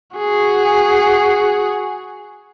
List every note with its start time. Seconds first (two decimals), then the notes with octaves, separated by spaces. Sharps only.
0.17 F#4 G#4